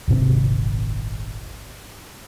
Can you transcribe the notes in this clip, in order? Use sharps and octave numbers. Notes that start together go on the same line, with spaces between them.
D#1 G#1 C3 C4